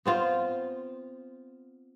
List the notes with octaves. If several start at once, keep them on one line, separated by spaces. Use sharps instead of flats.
B3 C4 F4